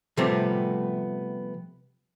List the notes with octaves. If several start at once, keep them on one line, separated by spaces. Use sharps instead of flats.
C3 F3 G3 A3 B3 C4